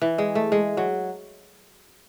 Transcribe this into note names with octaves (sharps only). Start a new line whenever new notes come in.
E3
G#3
A3
G#3
F#3